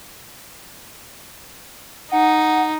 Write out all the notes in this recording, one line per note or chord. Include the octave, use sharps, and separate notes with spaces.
D#4 F#5